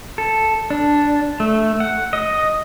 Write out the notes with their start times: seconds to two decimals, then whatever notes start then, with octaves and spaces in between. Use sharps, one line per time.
0.18 A4
0.70 D4
1.40 A3
1.80 F#5
2.13 D#5